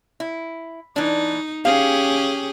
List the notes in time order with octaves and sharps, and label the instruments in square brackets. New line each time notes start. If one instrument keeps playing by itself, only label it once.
[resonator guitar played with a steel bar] E4
[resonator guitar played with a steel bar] E3 D4 [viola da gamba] D#4
[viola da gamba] C#4 G4 G#4 [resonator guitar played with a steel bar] F5